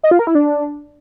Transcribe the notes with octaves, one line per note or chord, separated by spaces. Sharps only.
D#5
F4
A#4
E4
D4